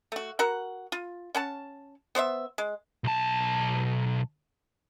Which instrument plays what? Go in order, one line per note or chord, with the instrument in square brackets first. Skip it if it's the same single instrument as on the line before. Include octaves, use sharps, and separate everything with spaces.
[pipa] A3 F#4
F#4 A#4 F#5
F4
C#4 F#5 A5
B3 C5 D5 E5
G#3
[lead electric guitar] B1 A5